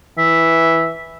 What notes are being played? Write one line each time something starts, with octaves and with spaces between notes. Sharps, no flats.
E3 E5